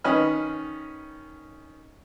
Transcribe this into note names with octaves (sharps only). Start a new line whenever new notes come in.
D#3 C#4 B4 D#5 B5 F6